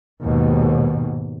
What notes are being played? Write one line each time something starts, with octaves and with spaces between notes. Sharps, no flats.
D#2 G#2 B2